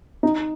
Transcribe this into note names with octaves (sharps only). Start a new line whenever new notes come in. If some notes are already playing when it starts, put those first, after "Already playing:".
D#4